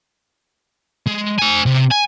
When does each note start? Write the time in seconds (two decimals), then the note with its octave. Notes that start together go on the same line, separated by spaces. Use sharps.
1.07 G#3
1.39 C5 G#5
1.66 C3
1.91 G#5